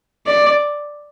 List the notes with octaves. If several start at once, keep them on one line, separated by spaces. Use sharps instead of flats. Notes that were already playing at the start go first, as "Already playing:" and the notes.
D5